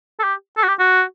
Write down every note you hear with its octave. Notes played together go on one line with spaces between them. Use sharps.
A4
G4
A4
F#4
G4
F#4